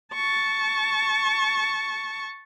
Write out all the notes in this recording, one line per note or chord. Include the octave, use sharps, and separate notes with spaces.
A5 C#6